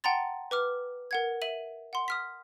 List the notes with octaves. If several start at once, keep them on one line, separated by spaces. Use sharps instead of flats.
F#5 G5 A5 A#5 C6 A6
B4 D6 F6
A#4 F#5 G#6
E5 D#7 F#7
F#5 C6
D#6 F6 B6